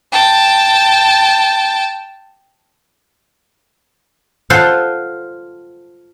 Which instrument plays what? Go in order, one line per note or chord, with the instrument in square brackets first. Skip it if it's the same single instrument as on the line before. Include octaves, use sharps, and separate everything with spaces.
[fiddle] G5 A5
[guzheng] F4 A4 C5 F#5 A5